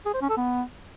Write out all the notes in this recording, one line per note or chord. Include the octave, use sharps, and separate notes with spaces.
G#4
C5
C#4
A4
B3